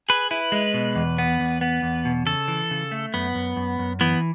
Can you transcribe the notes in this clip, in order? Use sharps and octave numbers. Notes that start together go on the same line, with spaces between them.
G#4 B4
E4 B4
G#3
B2
E2
B3
E2
B3
E2
B2
C#3 A4
E3
C#3
A3
F#2 B3
F#2
F#2
F#2
E3 B3